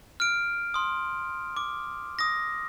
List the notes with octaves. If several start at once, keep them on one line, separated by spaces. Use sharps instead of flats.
F6 D7
C6 D#6
D6
D#6 A#6